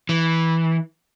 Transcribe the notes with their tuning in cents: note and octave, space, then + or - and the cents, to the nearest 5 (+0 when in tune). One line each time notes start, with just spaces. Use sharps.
E3 -10